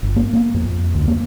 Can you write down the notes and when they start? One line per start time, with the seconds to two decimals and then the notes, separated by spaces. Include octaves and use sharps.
0.03 G1
0.16 A#3
0.33 A#3
0.54 F2
0.95 D2
1.08 A#3